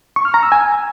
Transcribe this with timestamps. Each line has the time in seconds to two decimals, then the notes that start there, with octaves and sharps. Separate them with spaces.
0.16 C#6
0.25 F6
0.34 A#5
0.43 E6
0.52 G#5